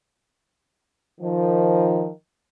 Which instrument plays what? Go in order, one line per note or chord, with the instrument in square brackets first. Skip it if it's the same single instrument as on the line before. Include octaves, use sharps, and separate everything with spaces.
[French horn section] D#3 F3